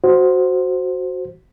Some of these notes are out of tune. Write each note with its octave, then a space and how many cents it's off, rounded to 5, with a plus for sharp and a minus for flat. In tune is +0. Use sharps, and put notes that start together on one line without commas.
F#4 +0 C5 +0